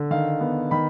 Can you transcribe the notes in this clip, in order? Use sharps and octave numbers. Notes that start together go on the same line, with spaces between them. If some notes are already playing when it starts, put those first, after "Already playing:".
Already playing: D3
D#3 F5
B3
D#3 B5